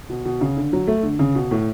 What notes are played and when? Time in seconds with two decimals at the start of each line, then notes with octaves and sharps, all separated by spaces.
0.10 B2
0.25 B2
0.41 C#3
0.57 D3
0.73 F#3
0.87 A3
1.03 D3
1.19 C#3
1.35 B2
1.51 A2